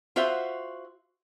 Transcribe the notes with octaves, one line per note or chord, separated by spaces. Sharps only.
F4 F#4 C5 E5 F#5